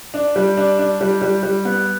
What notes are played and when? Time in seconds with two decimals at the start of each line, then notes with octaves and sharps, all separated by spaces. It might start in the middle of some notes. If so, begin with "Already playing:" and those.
0.14 D4
0.36 G3
0.57 D4
0.79 D4
1.01 G3
1.22 G3
1.43 G3
1.65 B3